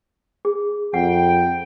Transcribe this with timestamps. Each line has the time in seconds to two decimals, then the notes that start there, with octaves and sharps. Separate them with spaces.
0.45 G#4
0.94 F2 F#5 G5